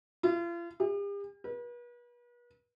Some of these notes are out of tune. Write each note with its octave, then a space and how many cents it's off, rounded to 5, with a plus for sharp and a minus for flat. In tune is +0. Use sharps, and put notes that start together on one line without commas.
F4 -40
G4 +45
B4 -40